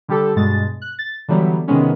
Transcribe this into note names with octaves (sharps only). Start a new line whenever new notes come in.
D3 G3 G4 A4
G2 B2 G#3 A6
F#6
A6
D3 E3 F#3 G3 B3
C3 D#3 G#3 B3 C#4